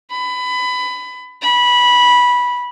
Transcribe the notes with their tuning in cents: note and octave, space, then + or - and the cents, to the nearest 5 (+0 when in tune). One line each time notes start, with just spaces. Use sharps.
B5 +20
B5 -15